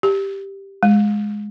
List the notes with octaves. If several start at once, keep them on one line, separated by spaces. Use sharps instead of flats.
G4
G#3